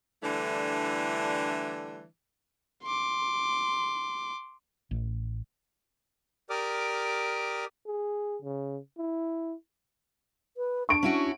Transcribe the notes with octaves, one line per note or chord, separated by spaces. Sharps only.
D3 E3 G3 A3 D4 E4
C6 D6
A1
G4 A#4 D5 D6 D#6 F6
G#4
C#3
E4
B4
D4 C#6 D7
C#4 E4 F#4